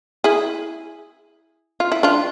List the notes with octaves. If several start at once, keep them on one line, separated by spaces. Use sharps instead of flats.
E4 G#4
F4
E4
D4 F4